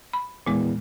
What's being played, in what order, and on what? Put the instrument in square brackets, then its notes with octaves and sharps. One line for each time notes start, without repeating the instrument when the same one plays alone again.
[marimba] B5
[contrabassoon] E2 [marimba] A#2 G#3